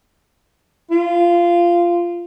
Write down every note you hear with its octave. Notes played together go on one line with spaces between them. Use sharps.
F4